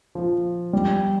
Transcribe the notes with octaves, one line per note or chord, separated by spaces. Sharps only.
F3
G3